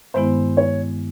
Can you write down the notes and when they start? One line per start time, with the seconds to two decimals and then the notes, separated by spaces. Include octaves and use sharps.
0.14 G2 D#3 G#3 B3 E4 C5
0.57 C#5